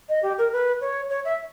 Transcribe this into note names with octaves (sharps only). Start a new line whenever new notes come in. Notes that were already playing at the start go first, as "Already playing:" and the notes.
D#5
G4
A#4
B4
C#5
C#5
E5